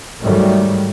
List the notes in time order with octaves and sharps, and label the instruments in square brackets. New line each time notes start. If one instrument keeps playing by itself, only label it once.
[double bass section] G#2 D#3 F#3 G3 A3